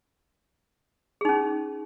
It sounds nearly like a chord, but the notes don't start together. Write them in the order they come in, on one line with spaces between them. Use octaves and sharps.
G#4 D#4 C#4